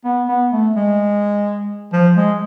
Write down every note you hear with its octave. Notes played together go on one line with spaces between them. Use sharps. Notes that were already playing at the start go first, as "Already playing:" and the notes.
B3
B3
A3
G#3
F3
G#3